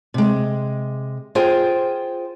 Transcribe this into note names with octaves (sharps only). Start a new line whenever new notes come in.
C3 G#3
F4 G#4 C5 G5